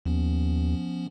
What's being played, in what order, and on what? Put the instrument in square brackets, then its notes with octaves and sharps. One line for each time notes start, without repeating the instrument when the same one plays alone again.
[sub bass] D#2 [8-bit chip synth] F3 B3 C#4